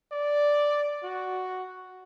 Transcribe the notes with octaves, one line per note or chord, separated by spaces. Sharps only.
D5
F#4